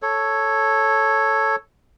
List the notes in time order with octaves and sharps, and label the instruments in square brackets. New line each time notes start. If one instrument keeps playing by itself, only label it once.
[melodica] A4 C#5